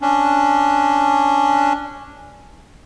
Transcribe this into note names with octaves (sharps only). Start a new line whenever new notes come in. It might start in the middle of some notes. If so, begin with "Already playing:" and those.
C#4 D4